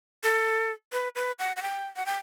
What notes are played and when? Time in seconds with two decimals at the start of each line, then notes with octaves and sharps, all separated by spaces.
0.23 A4
0.92 B4
1.16 B4
1.39 F#5
1.56 F#5
1.62 G5
1.97 F#5
2.06 G5